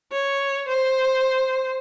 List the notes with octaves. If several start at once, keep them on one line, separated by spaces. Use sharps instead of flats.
C#5
C5